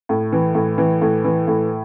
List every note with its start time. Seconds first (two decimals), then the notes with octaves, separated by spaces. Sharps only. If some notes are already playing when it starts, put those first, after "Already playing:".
0.09 A2
0.33 E3
0.55 A2
0.78 E3
1.02 A2
1.25 E3
1.48 A2